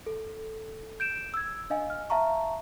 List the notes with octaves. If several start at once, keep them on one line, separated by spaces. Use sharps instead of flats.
A4
G6 D7 E7
E6 G#6
D4 D#5 F5 G#5
F6
E5 F5 A5 A#5 C#6